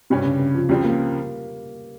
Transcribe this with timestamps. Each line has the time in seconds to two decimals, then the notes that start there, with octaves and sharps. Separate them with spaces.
0.10 G2 C3 G3 C#4
0.25 C#3
0.39 C#3
0.55 F3
0.69 C#2 C#3 F3 G3 C4
0.84 A#3